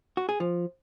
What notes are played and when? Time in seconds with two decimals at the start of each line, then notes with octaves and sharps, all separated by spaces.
0.17 F#4
0.29 G#4
0.40 F3